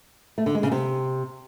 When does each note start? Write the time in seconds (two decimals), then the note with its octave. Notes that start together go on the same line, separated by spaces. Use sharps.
0.38 A3
0.46 D3
0.55 G#3
0.63 C#3
0.72 C3